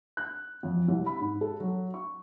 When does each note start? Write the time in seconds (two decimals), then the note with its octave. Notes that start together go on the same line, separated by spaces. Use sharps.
0.17 F#6
0.63 F2
0.88 C2
1.06 B5
1.20 G#2
1.41 A4
1.60 F#3
1.94 C#6